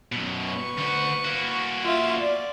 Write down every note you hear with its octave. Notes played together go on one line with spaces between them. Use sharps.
F#2 B2
B4 C#6
D2 F#4
A#3 F#4
F4 E5
D5